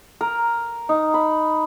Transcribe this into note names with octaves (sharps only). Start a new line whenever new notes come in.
A#4
D#4
B5